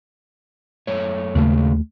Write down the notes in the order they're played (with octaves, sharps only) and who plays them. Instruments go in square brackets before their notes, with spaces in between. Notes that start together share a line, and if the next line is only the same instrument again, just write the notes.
[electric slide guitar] F#2 A3 C#5
[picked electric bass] D#2 A3 [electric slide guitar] A2 C#3 G#3